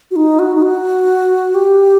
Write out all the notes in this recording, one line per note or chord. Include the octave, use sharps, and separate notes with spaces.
F#4
D#4
F#4
D#4
F#4
G4